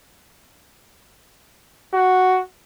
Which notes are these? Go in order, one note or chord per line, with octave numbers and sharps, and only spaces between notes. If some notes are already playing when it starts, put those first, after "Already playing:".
F#4